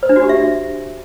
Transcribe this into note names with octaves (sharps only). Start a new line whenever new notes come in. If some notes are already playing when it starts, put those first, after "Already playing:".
C5
D4
F#4
G4
E5